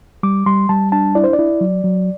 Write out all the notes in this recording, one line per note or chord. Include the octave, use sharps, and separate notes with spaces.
G3 D6
G3 C6
G3 A5
D4 A5
E4 D5
C5
D5
E4
F#3
F#3